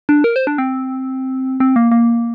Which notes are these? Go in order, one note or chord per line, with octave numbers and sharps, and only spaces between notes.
D4
A#4
C5
D4
C4
C4
A#3
A#3